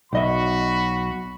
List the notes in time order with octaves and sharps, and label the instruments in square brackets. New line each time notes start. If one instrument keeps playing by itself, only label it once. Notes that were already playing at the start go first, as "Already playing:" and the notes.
[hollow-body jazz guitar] B1 D#5 E5 [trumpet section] F#4 B5